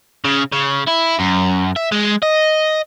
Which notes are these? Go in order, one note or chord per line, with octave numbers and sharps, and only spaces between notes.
C#3
C#3
E4
F#2
E5
G#3
D#5